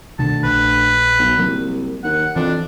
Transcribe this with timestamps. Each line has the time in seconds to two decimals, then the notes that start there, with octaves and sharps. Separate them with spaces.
0.19 D2 B2 D3 D#3 A5
0.44 A#1 B4
1.19 B1
1.38 C2 F#3 A#3
2.04 D#2 F#5
2.36 F2 E3 D4